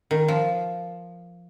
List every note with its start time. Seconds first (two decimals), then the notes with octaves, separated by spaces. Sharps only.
0.11 D#3
0.28 F3